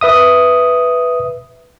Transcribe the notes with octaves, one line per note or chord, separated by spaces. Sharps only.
B4 E5 D#6